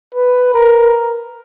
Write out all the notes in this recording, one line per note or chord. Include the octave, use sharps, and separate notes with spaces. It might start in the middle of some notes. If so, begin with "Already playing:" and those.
B4
A#4